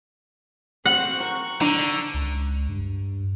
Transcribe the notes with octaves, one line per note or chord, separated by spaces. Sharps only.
C4 F#4 F#5
A#4 C#6
D3 D4 A#5
C#2
G2